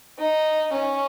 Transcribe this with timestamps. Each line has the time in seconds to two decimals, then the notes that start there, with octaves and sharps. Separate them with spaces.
0.18 D#4
0.73 C#4